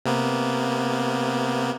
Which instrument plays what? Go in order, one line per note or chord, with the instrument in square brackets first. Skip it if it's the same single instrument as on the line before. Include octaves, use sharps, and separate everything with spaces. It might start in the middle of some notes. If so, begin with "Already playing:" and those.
[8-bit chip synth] C3 A#3 B3